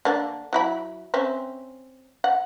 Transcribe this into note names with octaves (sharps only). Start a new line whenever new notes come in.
D3 A#3 D4
F#3 E4 B5
C4 C#4 E5
F#5